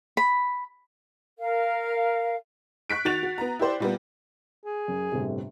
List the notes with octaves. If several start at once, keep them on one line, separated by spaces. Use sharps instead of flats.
B5
A#4 F5
C#6 F#6 B6 D7
D#3 F#4 F#6 A6 F7
F#4
B3 A#5
E4 G4 C5 D5
A#2 G3 B3
G#4
F#2
G1 A2 C3